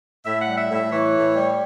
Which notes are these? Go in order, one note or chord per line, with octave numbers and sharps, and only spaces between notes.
A2 E5
F#5
G3
E5
A2 E5
E3 C#5
A2
G3